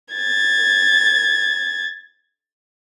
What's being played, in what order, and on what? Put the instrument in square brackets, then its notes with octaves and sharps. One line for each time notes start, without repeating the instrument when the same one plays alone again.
[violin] G#6 A6